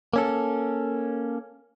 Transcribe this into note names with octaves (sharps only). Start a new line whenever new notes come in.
A#3 C#4 A4